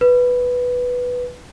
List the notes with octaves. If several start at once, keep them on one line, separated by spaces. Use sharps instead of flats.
B4